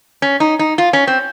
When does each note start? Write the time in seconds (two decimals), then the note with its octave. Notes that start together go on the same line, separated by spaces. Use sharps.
0.22 C#4
0.40 D#4
0.59 D#4
0.78 F4
0.93 C#4
1.07 C4